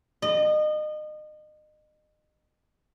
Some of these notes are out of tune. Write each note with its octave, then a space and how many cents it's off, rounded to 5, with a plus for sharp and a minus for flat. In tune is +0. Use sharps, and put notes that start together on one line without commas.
D#5 -30